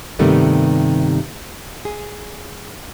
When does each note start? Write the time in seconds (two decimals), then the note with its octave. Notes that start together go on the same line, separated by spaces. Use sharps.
0.19 G2 C3 D#3 G3 A3 B3
1.85 G#4